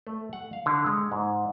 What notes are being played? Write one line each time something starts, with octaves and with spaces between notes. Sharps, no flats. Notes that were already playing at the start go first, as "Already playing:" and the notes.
A3
F#5
F5
D3
G#3
G#2